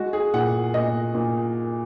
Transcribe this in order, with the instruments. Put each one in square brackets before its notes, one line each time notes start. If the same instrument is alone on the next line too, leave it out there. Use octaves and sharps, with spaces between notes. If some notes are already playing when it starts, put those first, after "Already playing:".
Already playing: [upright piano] G#3 F#4
G#4
A#2 F#5
A#2 D#5
A#2